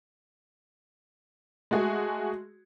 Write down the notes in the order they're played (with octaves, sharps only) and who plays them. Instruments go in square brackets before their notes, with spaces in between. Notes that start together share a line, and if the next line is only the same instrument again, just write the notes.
[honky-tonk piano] G#3 A3 F#4 G#4